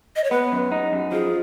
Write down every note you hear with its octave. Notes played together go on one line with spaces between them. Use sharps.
D#5
C#5
B3 B4
F#2
D#4
F#2
F3 G#4